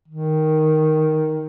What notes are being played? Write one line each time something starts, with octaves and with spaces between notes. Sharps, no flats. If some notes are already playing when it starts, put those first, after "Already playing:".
D#3